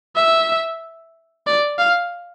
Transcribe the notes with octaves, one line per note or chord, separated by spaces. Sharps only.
E5
D5
F5